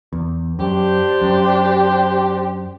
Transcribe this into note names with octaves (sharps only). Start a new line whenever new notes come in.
E2
F#2 D4 G4 C5
F#2